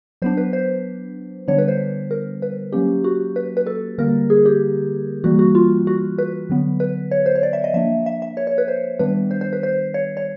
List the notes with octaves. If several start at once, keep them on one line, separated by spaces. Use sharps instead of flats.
F#3 B3 D4 C5
B4
C5
D3 G3 B3 D4 C#5
B4
C5
A#4
B4
F#3 A#3 C#4 G4
F#4
B4
B4
A4
D3 G3 A#3 A#4
G#4
G4
E3 G3 A#3 F#4
F#4
F4
F#4
B4
D3 F#3 B3
B4
C#5
C5
C#5
D5
E5
D#5
F3 A#3 D4 E5
E5
E5
C#5
C#5
B4
C5
D#3 G3 B3 D4 B4
C5
C5
B4
C5
C#5
C#5